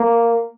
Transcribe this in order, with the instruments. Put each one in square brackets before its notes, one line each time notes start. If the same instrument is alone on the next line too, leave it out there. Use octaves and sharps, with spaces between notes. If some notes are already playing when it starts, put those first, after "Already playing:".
Already playing: [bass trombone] A#3